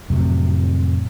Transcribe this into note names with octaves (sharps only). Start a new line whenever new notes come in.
F2 A2 C3 F#3